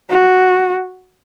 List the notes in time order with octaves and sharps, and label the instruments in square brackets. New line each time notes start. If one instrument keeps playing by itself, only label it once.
[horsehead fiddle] F#4